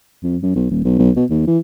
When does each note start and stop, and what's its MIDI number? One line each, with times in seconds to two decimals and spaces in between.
0.23 0.37 41
0.42 0.54 42
0.56 0.68 35
0.71 0.81 27
0.84 0.95 35
0.99 1.10 35
1.16 1.25 47
1.30 1.45 39
1.47 1.58 52